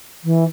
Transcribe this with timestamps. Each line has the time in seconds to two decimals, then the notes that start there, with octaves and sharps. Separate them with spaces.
0.24 E3